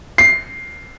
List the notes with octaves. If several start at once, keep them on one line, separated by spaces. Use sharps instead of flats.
C7